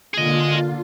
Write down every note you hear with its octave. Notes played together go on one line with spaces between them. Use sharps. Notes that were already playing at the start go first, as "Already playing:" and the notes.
D3 A#3 F4 G#4 D#5